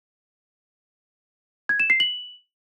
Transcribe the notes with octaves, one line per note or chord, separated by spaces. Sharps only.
G#6
E7
C7
F#7